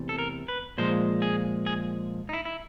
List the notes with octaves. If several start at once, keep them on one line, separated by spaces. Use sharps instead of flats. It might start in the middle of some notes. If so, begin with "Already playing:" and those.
Already playing: E2 C3 E3 A3
A4
A#4
B4
A#2 F3 G#3 C5
G#4
G#4
D#4
E4
E4